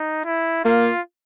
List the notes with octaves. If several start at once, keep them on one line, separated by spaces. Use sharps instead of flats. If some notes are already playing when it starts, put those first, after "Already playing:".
Already playing: D#4
E4
A#3 F4